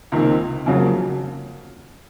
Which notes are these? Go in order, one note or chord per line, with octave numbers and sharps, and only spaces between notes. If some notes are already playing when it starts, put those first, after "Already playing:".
C#2 C3 D#3 A#3
F2 C#3 F#3 A#3